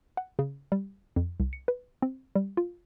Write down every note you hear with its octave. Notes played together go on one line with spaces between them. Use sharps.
F#5
C#3
G3
F2
C2
C#7
B4
C4
G3
F4